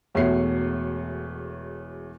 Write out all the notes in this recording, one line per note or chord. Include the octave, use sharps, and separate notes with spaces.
E1 E2 A3 F#4 C#5 C7